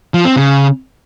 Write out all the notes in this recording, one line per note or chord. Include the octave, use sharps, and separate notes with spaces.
F3
C4
C#3